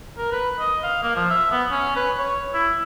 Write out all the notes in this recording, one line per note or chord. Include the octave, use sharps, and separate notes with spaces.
A#4
B4
D#5
F5
A#3
F3
E5
B3
C#4
B4
C#5
E4